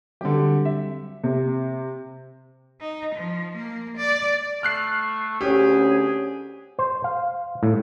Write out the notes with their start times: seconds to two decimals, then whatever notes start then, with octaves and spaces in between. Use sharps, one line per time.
0.21 D3 F#3 G3 C4 G4
0.65 E5
1.24 C3
2.81 D#4
3.15 F3
3.56 A#3
3.97 D5
4.63 A3 F6 F#6 C7
5.41 D2 C4 C#4 G4 G#4
6.79 C5
7.04 F5
7.63 A2